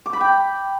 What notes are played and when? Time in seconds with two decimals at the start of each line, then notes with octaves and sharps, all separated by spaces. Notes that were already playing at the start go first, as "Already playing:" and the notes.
0.06 D6
0.13 B5
0.21 G5